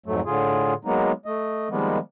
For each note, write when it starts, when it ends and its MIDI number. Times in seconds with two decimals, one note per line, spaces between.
0.06 0.21 41
0.06 0.21 44
0.06 0.21 54
0.06 0.21 57
0.25 0.74 45
0.25 0.74 50
0.25 0.74 65
0.25 0.74 68
0.85 1.12 54
0.85 1.12 56
0.85 1.12 58
0.85 1.12 59
0.85 1.12 63
1.26 1.69 57
1.26 1.69 75
1.70 1.99 51
1.70 1.99 53
1.70 1.99 55
1.70 1.99 56
1.70 1.99 58
1.70 1.99 59